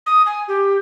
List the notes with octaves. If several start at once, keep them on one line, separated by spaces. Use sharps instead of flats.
D#6
G#5
G4